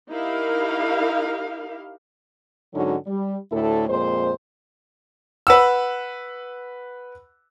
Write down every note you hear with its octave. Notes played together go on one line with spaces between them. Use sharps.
D#4 E4 G4 A#4 F5
G#2 D3 F#3 C#4 D#4 F#4
G3
D2 A2 E4 A4
F2 A#2 G#3 C5
B4 F#5 E6